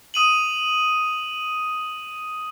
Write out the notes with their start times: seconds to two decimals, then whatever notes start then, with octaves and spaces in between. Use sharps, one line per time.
0.14 D#6 D#7 F#7